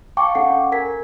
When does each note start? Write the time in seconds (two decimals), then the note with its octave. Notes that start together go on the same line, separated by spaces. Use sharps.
0.17 F5 G5 A5 C#6 D6
0.35 C#4 A4 F#5 C7
0.72 A#4 G#5 G#6 B6